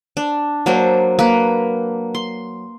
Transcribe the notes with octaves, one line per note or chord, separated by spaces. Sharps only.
D4
F#3 A#3 D4 C5
A#3 B4
C6